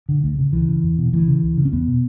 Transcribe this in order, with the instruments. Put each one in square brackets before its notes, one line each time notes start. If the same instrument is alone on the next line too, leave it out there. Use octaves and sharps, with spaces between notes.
[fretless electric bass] D3
D2
C#3
C#2 E3
C#3
E2
B2
D2 E3
C#3
C#2
C#3
C#4
E2 B3
B2